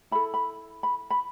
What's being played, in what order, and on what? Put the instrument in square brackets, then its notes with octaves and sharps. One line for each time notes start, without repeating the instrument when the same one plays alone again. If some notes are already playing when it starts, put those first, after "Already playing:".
[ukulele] E4 A4 B5
B5
B5
B5